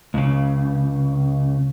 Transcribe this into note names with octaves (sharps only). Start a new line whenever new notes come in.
C#2 C#3